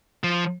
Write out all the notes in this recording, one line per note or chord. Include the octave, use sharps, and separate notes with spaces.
F3